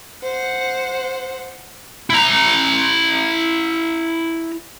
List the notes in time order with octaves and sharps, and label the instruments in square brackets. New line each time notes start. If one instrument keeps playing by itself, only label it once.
[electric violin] C5 F#5
[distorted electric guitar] E4 A#5